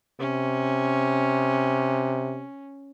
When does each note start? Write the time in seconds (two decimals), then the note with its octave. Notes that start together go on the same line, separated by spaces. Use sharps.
0.20 C3 C#4